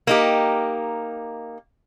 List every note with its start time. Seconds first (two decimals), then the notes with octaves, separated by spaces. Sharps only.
0.07 A#3 D#4 G4